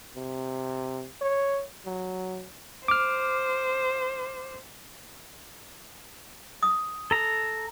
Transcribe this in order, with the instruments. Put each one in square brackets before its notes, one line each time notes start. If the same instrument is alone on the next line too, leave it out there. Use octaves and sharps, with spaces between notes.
[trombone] C3
C#5
F#3
[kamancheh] C5 [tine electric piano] D6 F6
[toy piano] D#6
[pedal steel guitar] A4 A#5